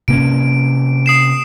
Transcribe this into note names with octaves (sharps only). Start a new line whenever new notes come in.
C3 A#3 C#4 D7
D#6 C7 E7